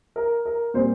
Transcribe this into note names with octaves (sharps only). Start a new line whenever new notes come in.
A#4
A#4
A#2 G3 C4 C5